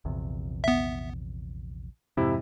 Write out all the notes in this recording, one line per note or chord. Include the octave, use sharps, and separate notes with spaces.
A#1 E2 C3
B3 E5
F2 G#2 C3 E4